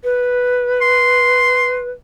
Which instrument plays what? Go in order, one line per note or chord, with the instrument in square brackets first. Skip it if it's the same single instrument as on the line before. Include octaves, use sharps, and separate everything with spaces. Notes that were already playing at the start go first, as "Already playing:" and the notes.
[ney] B4
[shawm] C6